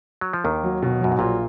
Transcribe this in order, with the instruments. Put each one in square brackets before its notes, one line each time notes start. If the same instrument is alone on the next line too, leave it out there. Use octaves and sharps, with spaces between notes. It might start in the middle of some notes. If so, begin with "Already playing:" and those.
[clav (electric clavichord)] F#3
F3
[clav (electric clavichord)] D#2 D#3 [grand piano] A#3
[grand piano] F#3
B2
[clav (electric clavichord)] F#2 [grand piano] F#3
[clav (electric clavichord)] G#2
[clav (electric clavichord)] A#1 A#2 [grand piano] F4